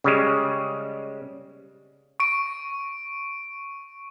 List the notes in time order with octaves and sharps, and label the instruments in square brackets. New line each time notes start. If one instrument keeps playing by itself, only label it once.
[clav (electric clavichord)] C#3 G3 G#3
[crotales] C#6 D7